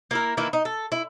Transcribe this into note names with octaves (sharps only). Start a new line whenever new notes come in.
A#3 E4 A#4
D#3 E3 A#3 E4
D#4
A4
E4